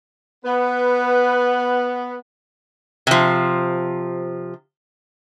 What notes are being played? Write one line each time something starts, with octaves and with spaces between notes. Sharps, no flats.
B3 B4
C3 F3